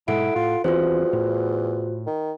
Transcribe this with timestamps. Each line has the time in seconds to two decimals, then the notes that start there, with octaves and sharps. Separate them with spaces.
0.08 G#2 B2 G#3 E4 A4 F#5 D7
0.36 A2 F4
0.64 D#1 E2 E3 C4 F4 F#4 C5
1.13 A2
2.07 D#3